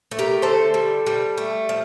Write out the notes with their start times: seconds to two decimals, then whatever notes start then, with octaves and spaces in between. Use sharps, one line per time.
0.11 A3
0.19 G4 A#4
0.42 D3 A4 C5
0.74 G3
1.06 G3
1.37 A3
1.69 F3